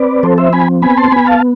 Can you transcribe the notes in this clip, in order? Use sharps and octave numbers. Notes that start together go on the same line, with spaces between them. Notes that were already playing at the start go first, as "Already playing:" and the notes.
Already playing: C4 B4 D5
F3 A4 C5
C5 E5
C4 G#5 B5
B3 G#5 B5
A5 C6
B3 G#5 B5
F5 A5